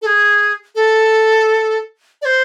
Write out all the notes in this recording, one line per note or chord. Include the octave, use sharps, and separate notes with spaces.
A4
G#4
A4
D5
C5